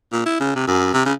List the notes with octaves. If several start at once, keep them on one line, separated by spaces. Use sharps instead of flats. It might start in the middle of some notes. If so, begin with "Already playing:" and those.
A#2
E4
C#3
C3
F#2
C3
C#3